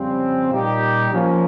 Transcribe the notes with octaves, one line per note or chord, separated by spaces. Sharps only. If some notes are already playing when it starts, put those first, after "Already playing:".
Already playing: F2 C#3 G3 C4
A#2 G3 A#3 D#4 G4
F3 A#3 C#4